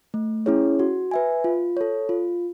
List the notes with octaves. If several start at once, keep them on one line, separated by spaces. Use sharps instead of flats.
A3
C#4 E4 G#4 C#5
F#4
B4 E5 G#5
F4
A4 C#5
F4